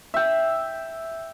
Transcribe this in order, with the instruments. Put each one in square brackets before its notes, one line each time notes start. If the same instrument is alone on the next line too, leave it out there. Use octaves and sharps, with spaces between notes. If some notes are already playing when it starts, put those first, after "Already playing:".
[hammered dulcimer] E5 G5